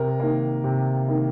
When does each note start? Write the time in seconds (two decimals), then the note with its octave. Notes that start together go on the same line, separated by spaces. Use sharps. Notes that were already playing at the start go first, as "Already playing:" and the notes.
Already playing: C3 A#4
0.20 D#3 A#3
0.64 C3
1.08 D#3 A#3